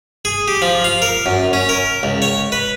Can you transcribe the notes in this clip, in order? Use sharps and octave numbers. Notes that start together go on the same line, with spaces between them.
G#4
G4
F3
F5
A#4
F#2
C#4
A#4
C#2
C#5
B4